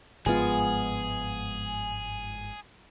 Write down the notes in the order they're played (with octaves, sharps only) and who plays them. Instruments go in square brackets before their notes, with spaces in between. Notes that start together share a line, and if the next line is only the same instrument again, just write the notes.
[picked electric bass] G1 G#2 F3 [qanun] G#3 B3 F4 [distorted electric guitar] G#4 [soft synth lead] G#5